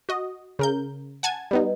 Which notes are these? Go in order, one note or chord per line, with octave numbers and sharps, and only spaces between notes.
F#4 D#5
C#3 A#4 G6
F#5 G#5 A5 G#6
G3 B3 D#4